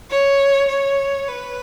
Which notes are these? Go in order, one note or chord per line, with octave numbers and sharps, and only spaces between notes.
C#5
C#5
B4